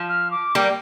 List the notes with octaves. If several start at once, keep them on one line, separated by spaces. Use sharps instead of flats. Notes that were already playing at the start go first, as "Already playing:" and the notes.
Already playing: F3
F6
D6
G3 A#3 G5